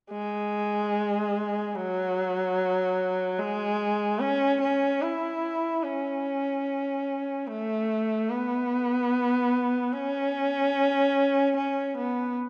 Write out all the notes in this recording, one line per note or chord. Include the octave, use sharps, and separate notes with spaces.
G#3
F#3
G#3
C#4
C#4
E4
C#4
A3
B3
C#4
C#4
B3